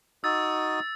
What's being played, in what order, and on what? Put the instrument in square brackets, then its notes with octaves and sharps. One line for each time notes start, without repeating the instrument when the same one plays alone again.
[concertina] D#4 F#4 D#6 [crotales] E6 A6